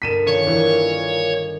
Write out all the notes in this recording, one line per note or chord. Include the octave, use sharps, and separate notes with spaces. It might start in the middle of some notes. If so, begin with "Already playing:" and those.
G1 A4 A#4 B6 D#7 E7
A#2 D#3 C#5
E3